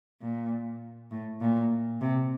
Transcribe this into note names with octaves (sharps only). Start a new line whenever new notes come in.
A#2
A2
A#2
C3